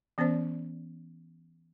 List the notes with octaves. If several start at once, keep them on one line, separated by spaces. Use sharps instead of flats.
E3 B3 C#4 C5 D5